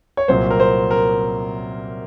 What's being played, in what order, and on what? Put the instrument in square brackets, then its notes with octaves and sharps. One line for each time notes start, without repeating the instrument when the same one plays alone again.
[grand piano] C#5
C2 A#2 F#3 C5
A#4
C5
A#4